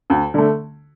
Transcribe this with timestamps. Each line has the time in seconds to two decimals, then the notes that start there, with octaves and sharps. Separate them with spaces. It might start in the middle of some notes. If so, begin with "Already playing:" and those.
0.10 D2
0.34 D3 A3